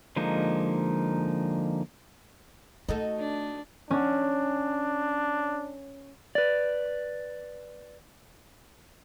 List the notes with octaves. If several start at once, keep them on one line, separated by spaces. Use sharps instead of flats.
D3 F3 G#3 A#3 D#4
A3 D#4 F#4 A4
D4
C#4 D4
B4 D5